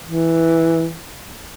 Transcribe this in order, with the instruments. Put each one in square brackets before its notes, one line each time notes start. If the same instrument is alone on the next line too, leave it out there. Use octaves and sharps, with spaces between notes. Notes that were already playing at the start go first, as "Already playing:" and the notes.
[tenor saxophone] E3